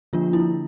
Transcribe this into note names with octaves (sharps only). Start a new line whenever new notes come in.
D3 F3 A#3 D4 F4
E4